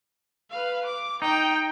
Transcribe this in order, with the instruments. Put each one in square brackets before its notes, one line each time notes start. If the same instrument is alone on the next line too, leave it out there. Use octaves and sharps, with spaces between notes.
[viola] B4 F5
D6
[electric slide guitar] D#4 [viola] G5